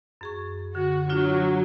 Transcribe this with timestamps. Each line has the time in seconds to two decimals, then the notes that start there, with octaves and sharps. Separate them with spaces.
0.21 F#2 G#4 C#6
0.75 D3 F#4
1.10 F#3 D4 F4 F#4